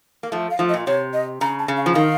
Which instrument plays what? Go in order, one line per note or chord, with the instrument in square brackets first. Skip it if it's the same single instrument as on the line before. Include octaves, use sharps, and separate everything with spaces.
[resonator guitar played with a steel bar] A#3
F3 A3
[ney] F5
[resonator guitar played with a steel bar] F3 A3
[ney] D#5
[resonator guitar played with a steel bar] A#2
[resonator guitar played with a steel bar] C3 [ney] C#5
[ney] D#5
[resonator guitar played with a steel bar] C#3 [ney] A#5
[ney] A5
[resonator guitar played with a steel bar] C#3
[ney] F5
[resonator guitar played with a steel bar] F3
[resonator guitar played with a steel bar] D#3 [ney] F5